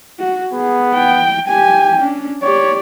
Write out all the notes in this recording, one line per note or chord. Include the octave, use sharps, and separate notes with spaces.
F#4
B3 G#4
G5
G4 G5 G#5
C#4 D4
G4 C#5 D5